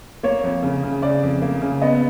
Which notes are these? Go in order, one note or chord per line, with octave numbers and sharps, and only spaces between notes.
A#3 C#5
F2
C#3
C#3
C#3 D5
F2
A#3
C#3
B3 D#5